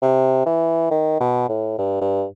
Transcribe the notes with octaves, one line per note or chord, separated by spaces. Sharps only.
C3
E3
D#3
B2
A2
G2
G2